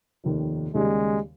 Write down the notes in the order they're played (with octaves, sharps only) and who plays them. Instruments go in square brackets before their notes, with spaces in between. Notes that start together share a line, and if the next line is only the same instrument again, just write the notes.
[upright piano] F1 D#2 D#3
[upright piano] D#2 C#3 G3 [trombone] G#3